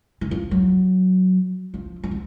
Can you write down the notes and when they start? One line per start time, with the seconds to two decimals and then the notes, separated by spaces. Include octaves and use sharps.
0.21 E3
0.31 F3
0.51 F#3
1.74 F3
2.03 F3
2.11 F#3